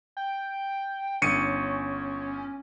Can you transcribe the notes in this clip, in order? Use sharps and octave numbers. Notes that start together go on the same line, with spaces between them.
G5
G1 C#4 C#7 D#7